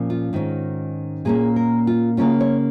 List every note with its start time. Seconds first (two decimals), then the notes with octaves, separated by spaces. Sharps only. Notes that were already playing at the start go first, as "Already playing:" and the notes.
Already playing: A#2 F3 C#4
0.10 F4
0.33 G#2 D#3 C#4
1.25 A#2 A#3 C#4 G#4
1.56 A#4
1.87 F4
2.17 C#3 A#3 C#4 F4
2.41 C#5